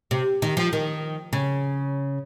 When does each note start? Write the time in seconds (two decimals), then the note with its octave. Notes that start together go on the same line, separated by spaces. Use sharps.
0.11 C3
0.42 D#3
0.57 F3
0.73 D#3
1.33 C#3